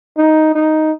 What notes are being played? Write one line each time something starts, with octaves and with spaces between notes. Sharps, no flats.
D#4
D#4